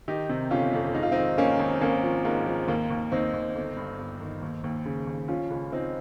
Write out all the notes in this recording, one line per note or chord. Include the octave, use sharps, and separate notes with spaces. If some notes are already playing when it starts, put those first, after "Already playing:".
D#3 D#4 G4
C3
G1 C#4 F4
F2
G#2 D#4
F4
D#3 C4 D#4
G#1 A#3 C#4
G#1
G#1 A#3 C#4
F3
G#2 A#3
F3
D#2 A#3
D#2
D#2 C4 D#4
D#2
G1
G2
G1
D#3
D#2
D#2
C#3
D#2
F3 C#4 F4
C#2
C#2 C4 D#4